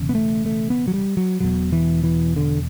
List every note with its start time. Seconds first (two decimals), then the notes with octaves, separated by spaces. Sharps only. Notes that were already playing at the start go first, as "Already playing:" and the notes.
Already playing: E1 E2 C#3
0.09 B3
0.15 A3
0.46 A3
0.70 B3
0.88 F#3
0.94 G3
1.17 F#3
1.41 E1 E2 B2 F#3
1.73 E3
2.04 E3
2.36 D3